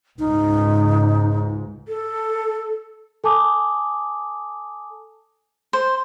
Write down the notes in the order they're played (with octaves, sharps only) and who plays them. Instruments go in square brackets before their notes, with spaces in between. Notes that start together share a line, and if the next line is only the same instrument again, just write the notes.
[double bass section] C#2 G#2 [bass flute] D#4
[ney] A4
[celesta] A4 G#5 A5 D6 D#6
[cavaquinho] C5